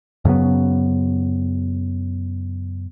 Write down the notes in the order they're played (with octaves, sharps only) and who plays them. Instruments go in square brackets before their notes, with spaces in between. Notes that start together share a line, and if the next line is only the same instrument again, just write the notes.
[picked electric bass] F#2 C#3 F#3 B3